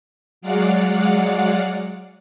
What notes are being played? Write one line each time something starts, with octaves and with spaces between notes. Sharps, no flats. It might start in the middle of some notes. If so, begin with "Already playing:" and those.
F#3 G#3 D5 F5 F#5